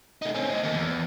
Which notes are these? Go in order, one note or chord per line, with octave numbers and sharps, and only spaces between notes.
A3 D#4
C4 C#4
A3 D#5
D#3 A#3
E2